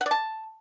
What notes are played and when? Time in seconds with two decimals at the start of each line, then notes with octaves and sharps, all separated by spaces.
0.01 F#5
0.06 D5
0.11 A5